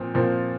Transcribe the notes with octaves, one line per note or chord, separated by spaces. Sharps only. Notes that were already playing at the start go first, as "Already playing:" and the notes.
Already playing: A#2 F3 C4
A#2 F3 C4